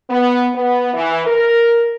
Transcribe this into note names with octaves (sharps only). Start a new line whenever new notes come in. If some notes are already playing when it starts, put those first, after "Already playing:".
B3
B3
E3
A#4